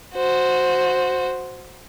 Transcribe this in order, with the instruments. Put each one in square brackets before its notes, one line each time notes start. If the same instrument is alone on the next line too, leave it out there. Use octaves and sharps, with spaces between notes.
[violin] F#4 C5